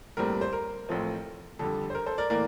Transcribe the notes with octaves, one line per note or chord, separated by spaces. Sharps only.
A#1 A2 G3 C4 A#4
C5
A#4
A1 A2 F3 A3 C4
F2 D3 G3 A4
C5
A#4
A4 C5
A#4 D5
A2 E3 A#3 A#4 D5